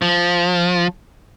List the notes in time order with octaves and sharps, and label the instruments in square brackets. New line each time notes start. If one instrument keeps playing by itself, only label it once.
[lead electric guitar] F3